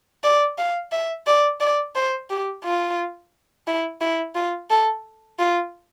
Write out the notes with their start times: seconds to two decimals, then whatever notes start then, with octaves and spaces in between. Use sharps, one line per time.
0.24 D5
0.58 F5
0.92 E5
1.27 D5
1.60 D5
1.95 C5
2.30 G4
2.64 F4
3.67 E4
4.01 E4
4.35 F4
4.70 A4
5.39 F4